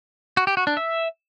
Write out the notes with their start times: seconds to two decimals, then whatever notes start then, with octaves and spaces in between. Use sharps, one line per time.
0.37 F#4
0.47 G4
0.57 F#4
0.67 D4
0.77 E5